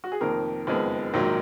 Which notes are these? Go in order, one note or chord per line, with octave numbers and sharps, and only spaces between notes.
F#4
G#4
F1 F2 D#3 A#3 A#4
F#1 F2 D#3 G#3 B3
A#1 G#2 D#3 F#3 A#3